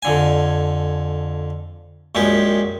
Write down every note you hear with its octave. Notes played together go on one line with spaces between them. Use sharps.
F2 D3 G#5
A#1 F#2 G#3 G4